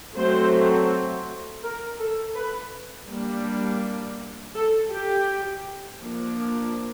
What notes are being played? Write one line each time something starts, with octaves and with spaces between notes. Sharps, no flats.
F#3 A3 C4 C5
A#4
A4
B4
G3 A#3 D4
A4
G4
F3 A#3 D4